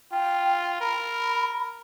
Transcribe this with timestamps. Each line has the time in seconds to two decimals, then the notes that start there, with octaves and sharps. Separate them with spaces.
0.12 F4 G5
0.81 A#4 B5